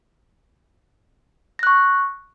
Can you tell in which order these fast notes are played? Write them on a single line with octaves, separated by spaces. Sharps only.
A#6 F#6 C#6